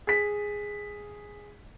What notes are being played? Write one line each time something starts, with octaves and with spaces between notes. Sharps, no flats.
G#4 B6